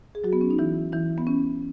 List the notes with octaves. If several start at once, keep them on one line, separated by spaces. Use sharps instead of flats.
G#4
F#3 F#4
B3
C#4
D#4
E3 E4
E3 E4
B3
C#4